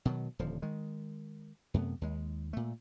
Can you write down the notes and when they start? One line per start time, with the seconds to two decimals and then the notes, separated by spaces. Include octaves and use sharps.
0.05 B2 D#3 F#3
0.39 D#1 D3 F3
0.62 D#3 G#3
1.74 F#2 C3 A3 B3
2.01 D#2 G#3
2.53 A#2 A3